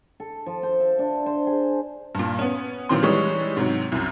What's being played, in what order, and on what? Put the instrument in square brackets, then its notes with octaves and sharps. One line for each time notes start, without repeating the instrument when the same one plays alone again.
[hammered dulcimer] A4
F3
C5
E5
D4
C5
G#4
[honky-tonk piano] G2 A#2
B3 C#4
A#2 D#3 E3 F#3 C4 C6
E3 G3 G#3 D#4 C#5
G#2 C3 F#3
C2 F#2